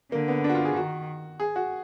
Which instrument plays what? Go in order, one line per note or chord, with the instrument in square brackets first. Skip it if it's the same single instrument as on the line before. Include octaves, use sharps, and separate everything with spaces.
[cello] D3 [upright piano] A#3
[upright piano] B3
D4
F#4
F4
G#4
[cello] D#3 [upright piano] F#4
[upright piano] G#4
F#4